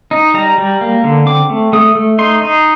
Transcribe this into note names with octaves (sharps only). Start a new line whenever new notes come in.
D#4
G3 A#5
G3
A#3
D3
C4 D6
A3
A3 D#6
A3
D#4 C6
D#4